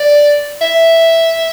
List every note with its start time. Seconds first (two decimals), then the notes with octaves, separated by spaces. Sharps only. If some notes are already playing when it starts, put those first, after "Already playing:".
Already playing: D5
0.61 E5